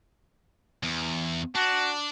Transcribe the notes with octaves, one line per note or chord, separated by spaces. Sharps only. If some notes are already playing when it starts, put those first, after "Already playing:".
E2
D4 F#4